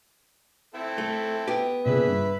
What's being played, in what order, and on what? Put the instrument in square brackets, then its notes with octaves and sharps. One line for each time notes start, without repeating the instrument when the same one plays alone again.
[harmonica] C4 E4 A4
[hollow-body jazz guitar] A3
B3 G4
[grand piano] A#2 C#3 G#4 [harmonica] B4 E5
[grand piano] G2